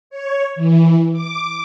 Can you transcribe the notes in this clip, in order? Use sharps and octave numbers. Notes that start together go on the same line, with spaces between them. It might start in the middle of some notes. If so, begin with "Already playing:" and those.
C#5
E3
D6